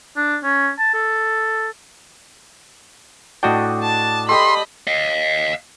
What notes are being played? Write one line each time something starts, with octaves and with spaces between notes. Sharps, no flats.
D4
C#4
A5
A4
A2 D4 F#4 D#5 G5
A5
G4 A4 D#5 B5 C6
D#5 F5